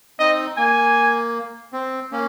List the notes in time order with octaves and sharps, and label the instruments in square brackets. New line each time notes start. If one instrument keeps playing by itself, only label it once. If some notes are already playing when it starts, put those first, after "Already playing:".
[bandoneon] C4 D#4 [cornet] D#5
[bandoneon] A#3 [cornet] G#5
[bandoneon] C4
A#3 C#4